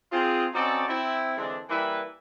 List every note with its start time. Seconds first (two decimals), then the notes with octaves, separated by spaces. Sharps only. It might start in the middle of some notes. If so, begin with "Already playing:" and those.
0.12 C4 F4 G#4
0.54 C4 C#4 D#4 F#4 A4 D5
0.88 C4 E4
1.37 D3 E3 G#3 C4 D4
1.69 E3 G3 A#3 E4 B4